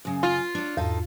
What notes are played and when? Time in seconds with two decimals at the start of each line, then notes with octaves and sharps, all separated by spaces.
0.05 F#2 C#3
0.23 F4
0.55 D4 C#5
0.77 E2 G#2 D#4 F4 A4